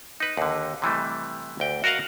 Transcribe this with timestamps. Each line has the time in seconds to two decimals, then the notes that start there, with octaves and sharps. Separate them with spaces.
0.20 D#4 B4
0.37 D#2 D3
0.82 C3 E3 G3 A3
1.60 D2 G5
1.84 F#4 A#4 D#5 F5 F#5